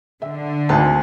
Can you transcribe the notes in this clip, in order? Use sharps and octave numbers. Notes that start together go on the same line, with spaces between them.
D3 E5
G#1 D2 A5